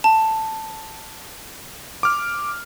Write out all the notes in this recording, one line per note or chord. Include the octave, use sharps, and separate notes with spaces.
A5
D6 F6